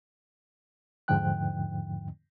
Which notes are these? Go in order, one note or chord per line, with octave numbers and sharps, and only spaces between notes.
E2 G#2 D3 F3 G5 F#6